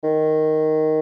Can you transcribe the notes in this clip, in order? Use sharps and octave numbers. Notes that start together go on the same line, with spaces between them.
D#3